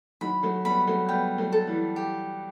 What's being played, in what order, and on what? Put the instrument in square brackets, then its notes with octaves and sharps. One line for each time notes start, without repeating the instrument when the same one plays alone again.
[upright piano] D#3 F#3 [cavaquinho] B5
[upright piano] F#3 A3
[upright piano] G3 B3 [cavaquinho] B5
[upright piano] F#3 A3
[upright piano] G3 B3 [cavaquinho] G5
[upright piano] F#3 A3
[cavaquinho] A4
[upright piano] E3 G3
[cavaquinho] G4